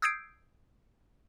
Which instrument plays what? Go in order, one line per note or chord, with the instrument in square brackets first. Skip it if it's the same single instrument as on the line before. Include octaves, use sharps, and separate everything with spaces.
[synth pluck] D#6 E6 G6 G#6 C7 D7